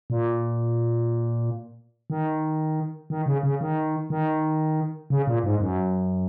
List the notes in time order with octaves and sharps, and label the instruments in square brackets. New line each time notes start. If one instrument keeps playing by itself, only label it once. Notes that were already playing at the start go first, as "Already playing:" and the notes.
[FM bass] A#2
D#3
D#3
C#3
C#3
D#3
D#3
C#3
A#2
G#2
F#2